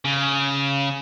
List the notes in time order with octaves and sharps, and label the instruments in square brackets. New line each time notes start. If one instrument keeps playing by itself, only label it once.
[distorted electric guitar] C#3